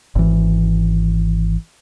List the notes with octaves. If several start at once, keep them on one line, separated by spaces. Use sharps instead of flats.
G#1 E3